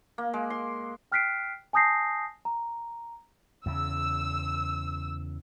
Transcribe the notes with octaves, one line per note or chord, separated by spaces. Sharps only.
A#3
G#3
C6
G5 F6 F#6 B6 C7 D7
G#5 A5 D#6 G6 A#6 C7
A#5
E2 C#3 E6